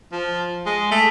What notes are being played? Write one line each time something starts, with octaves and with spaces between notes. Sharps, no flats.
F3
G#3
A3